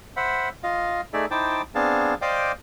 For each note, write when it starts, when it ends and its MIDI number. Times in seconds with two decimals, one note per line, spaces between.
0.16 0.49 72
0.16 0.49 76
0.16 0.49 78
0.16 0.49 83
0.63 1.01 65
0.63 1.01 75
0.63 1.01 77
1.13 1.26 57
1.13 1.26 63
1.13 1.26 68
1.13 1.26 74
1.13 1.26 76
1.31 1.62 63
1.31 1.62 64
1.31 1.62 72
1.31 1.62 79
1.31 1.62 81
1.31 1.62 86
1.75 2.15 59
1.75 2.15 60
1.75 2.15 62
1.75 2.15 68
1.75 2.15 77
1.75 2.15 81
2.22 2.52 72
2.22 2.52 74
2.22 2.52 75
2.22 2.52 77
2.22 2.52 79
2.22 2.52 86